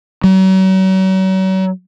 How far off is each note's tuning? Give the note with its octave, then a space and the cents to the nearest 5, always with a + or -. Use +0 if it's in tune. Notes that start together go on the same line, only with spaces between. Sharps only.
F#3 +40